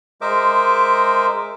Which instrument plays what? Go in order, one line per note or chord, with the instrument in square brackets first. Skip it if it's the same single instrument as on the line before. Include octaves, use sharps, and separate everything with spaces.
[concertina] G#3 A#4 C5 D#5 E5 D6